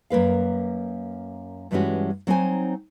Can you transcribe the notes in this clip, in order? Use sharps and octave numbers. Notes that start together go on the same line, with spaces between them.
F#2 A#3 B4 F5
G2 E3 G3 G#3 C#4 F#4
F#3 C4 D#4 C5 G#5